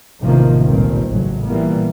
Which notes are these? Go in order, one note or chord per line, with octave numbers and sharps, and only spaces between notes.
A1 C3 D#3 F3 A#3
G1 C#2 G2 A#2 D#3 C4
A1 A2 C#3 F#3
A#2 E3 G3 A#3 B3